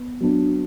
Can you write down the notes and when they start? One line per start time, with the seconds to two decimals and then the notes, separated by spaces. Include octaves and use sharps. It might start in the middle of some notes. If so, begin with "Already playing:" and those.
Already playing: B3
0.21 F#3 B3 D4